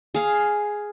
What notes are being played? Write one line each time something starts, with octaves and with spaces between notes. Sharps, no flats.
G#4 F5